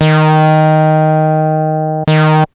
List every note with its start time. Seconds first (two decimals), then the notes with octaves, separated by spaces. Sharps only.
0.01 D#3
2.08 D#3